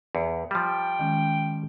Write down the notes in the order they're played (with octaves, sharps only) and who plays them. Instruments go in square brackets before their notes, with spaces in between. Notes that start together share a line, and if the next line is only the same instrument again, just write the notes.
[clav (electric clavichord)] E2
[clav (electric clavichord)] F3 G3 [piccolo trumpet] G5
[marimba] D#3 G#3 C#4